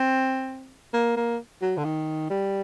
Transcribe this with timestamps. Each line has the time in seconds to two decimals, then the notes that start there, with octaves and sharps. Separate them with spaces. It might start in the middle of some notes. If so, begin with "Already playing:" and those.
Already playing: C4
0.93 A#3
1.16 A#3
1.62 F#3
1.77 D3
1.84 D#3
2.30 G3